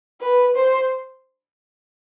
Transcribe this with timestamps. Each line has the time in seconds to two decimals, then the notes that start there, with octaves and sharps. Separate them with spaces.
0.21 B4
0.56 C5